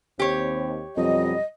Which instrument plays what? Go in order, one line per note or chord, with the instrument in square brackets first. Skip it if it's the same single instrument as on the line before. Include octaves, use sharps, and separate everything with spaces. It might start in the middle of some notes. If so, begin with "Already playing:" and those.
[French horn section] D#2 C4 [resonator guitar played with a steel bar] G4 C#5
[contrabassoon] F2 [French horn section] B2 F#3 G3 [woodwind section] D#5